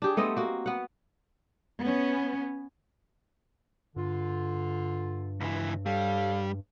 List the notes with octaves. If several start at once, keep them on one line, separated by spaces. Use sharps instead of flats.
D4 G4 G#4
A3 B3 C4 D#5
A#3 F#4
B3 F#5
B3 C#4
G2 D3 F4
C#2 E3
G3 A4 C#5 F5